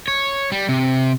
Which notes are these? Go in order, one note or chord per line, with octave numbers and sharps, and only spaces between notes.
C#5
G3
C3